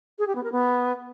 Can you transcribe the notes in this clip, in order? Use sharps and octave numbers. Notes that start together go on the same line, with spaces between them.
G#4
G4
B3
A#4
B3